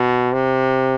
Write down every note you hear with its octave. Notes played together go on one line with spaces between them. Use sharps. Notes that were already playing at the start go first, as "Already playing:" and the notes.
Already playing: B2
C3